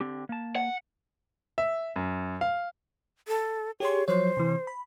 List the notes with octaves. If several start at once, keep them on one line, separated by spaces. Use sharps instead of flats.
D3 C4 G4
A#3 A5
F#5
E5
F#2
F5
A4
G4 G#4 C#5 C6
F3 F#3 C5 C#5
C3 E3
B5